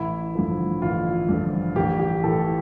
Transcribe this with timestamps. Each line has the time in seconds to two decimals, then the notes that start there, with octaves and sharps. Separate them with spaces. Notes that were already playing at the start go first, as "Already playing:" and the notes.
Already playing: A1 E4
0.35 G2 D3 F3
0.82 A1 F4
1.29 G2 D3 F3
1.76 A1 G4
2.00 G4
2.24 A2 E3 A4